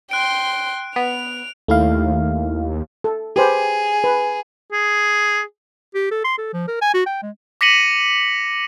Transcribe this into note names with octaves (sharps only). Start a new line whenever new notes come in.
G5 C6 F#6 D7
B3 F7
D#2 A3 E4 F5
A4
G4 G#4 B4 C5
B4
G#4
G4
A4
C6
A4
F3
A#4
G#5
F#4
G5
G#3
D6 A#6 B6 C#7 D#7 F#7